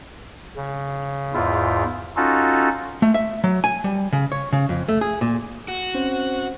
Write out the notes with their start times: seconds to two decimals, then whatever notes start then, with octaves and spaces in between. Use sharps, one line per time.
0.56 C#3
1.34 E2 G#2 E4 F4
2.17 C#4 D#4 F4 F#4 A4
3.02 A3
3.14 E5
3.44 F#3
3.64 G#5
3.84 G3
4.13 C#3
4.32 C#5
4.53 C#3
4.69 F2
4.89 A3
5.01 G#4
5.21 A#2
5.68 F#4
5.94 C4 C#4 C5